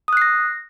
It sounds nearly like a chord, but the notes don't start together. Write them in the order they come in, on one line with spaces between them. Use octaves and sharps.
D#6 F#6 C7 A#6